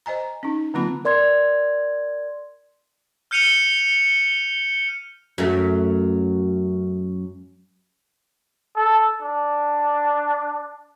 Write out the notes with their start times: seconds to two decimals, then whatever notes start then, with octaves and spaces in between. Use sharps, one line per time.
0.06 C5 D#5 G#5 A#5
0.43 C#4 D#4
0.74 D3 F#3 A#3 C4 F4 B5
1.05 A#4 D5 C6 G#6
3.31 F6 G6 C#7 D#7 F7 G7
5.38 F#2 A3
8.76 A4
9.22 D4